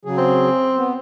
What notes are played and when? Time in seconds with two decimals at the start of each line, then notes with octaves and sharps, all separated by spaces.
0.05 C#3 F#3 G#4
0.17 C4
0.77 B3